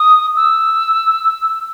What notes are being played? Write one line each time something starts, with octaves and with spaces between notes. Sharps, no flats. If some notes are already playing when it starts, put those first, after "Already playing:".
Already playing: D#6
E6